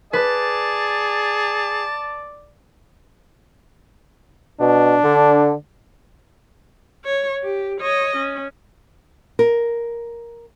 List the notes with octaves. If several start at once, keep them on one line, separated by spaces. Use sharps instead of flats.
G#4 B4 D5 A5
B2 D4
D3
C#5
G4
C#5 D#5
C#4
A#4